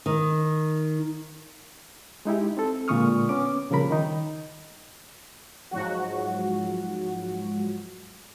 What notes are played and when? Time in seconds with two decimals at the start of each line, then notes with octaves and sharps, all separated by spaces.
0.06 D#3
2.25 G#3 D#4 E4 G4
2.57 C4 A4
2.88 A#2 D3 G#3 C#6 D#6 F6
3.29 B3 C#4 D6
3.70 A#2 C#3 F3 G3 A#4 B5
3.90 D#3 D#4
5.71 G#2 F3 F#3 F#4